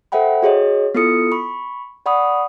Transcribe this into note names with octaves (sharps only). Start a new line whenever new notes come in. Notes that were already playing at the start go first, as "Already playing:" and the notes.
A4 C5 E5 F#5 G5 B5
F#4 G#4 C#5 D#5
B3 E4 F4 A4 D#6 C#7
B5 C#6
D5 F#5 B5 C#6 D#6